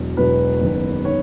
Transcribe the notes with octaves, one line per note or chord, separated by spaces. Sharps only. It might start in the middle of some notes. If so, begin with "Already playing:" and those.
Already playing: E1 E2 B2 F#3
E1 E2 B2 F#3 B4
F#1 E2 D#3
D#3 C#5